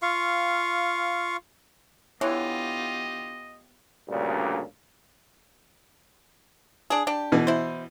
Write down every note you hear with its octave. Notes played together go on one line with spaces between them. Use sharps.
F4 F5 C#6
D3 E3 B3 F4 G4 C#5 D#5
D2 G2 A#2 C#3
D4 G#4
D4 G4
B2 E3
E4 C5